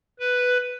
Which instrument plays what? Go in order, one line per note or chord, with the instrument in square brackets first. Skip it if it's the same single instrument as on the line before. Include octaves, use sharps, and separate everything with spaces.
[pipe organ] B4